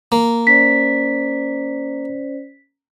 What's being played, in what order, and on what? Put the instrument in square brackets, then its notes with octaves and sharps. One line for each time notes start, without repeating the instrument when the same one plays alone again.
[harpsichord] A#3
[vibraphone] C#4 C5 D5 [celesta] B6